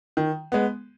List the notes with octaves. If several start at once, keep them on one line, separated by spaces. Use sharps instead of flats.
D#3
G#3 B3